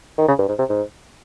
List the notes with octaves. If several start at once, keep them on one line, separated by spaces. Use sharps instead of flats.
D#3
C#3
G2
G#2
C3
G#2